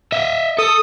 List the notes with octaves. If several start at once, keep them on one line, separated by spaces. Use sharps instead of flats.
D#5 E5
A4 D#6